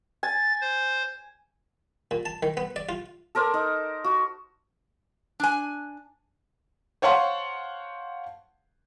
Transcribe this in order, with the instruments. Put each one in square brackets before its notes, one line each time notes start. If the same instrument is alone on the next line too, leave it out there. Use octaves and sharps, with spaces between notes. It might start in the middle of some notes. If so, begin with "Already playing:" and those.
[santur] G#5 [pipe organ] A6
[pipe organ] C5
[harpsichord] A#2
A5
D#3
B3
D5
F4
[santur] A4 A#4 C5 D5
D#4
F#4
[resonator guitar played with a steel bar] D4 G#5
[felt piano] C5 C#5 F5 F#5 A5 C6